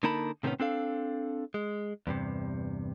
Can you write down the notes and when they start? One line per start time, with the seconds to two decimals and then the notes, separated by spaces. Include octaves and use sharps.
0.03 D3 A#3 D#4 A#4 A5 B5
0.43 A2 C3 D#3 G3 B3 C#4
0.60 C4 D4 A4 F5
1.54 G#3
2.07 E2 G2 C3